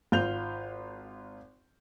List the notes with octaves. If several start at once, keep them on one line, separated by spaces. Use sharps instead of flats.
G#1 F4 G6 F7